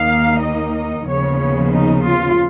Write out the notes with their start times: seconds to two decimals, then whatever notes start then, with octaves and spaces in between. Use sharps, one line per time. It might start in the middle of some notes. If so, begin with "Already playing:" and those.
Already playing: D#2 D#3 A#3 D#4 F5
0.41 D#5
0.74 D#5
1.07 D#2 C#3 F3 B3 C#5
1.39 C#5
1.72 D#4
2.05 F4